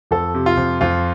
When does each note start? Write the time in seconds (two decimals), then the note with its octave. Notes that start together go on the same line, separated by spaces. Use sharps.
0.11 F2 A4
0.34 C3
0.46 F4
0.57 F2
0.81 F2 F4